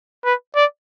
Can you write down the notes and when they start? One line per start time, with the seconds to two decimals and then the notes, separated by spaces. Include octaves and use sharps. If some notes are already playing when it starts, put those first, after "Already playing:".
0.24 B4
0.55 D5